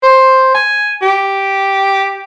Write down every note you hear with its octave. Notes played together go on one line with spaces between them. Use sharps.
C5
G#5
G4